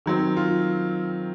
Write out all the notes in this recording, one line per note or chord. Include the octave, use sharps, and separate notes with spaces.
D#3 F#3 C4
F4